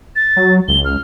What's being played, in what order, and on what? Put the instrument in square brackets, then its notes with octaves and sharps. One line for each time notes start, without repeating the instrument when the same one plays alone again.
[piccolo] A6
[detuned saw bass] F#3
[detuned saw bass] C#2 [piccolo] G7
[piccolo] F6